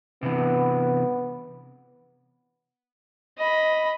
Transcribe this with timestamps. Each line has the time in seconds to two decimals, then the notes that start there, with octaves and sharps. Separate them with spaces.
0.23 C3 E3 B3
3.38 D#5 B5